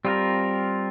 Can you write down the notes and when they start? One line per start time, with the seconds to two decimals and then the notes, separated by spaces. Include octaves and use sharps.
0.05 G3 C4 F4 A#4